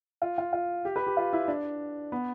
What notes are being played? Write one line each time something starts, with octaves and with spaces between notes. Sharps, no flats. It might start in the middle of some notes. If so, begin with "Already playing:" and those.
F4
F4
F4
G4
B4
G4
F4
E4
D4
B3